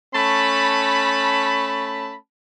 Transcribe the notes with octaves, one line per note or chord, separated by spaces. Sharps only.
A3 C#4 A5 B5